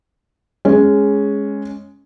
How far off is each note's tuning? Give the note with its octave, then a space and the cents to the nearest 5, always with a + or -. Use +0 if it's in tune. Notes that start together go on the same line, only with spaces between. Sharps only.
G#3 +0 C#4 +0